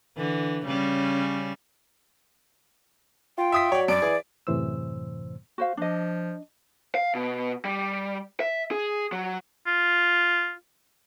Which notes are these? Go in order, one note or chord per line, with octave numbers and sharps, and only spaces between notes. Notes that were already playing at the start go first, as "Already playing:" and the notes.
D3 E3
C#3 G3 C#4
F4 G5
E5 D#6 B6
F#3 C#5 D5
F#2 D5 D7
E3 G#4
F#2 A2 C3 E3 C5 E6
F#4 C5 F5
F3 D4 D#5
F5
B2
G3
E5
G#4
F#3
F4